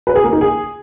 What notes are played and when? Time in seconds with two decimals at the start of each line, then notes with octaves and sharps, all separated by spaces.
0.07 B4
0.15 G#4
0.24 A#3
0.33 D#4
0.41 G#4